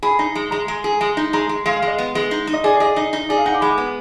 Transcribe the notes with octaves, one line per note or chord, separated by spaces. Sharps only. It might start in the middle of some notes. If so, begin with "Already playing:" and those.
G#4 B5
D#4 A#5
G#3
G#3 A#5
G#3
G#4
G#3
D#4
G#3 A#5
G#3
G#3 F5
F5
G#3 D#5
B3
G#3
D#4
D#4
D#5
G#4 D5
D5
G#4 D#5
D5
D#4 D#5
D#4
G#4 D5
F5
D#4 F#5
D6
G#3 B5
D6
B3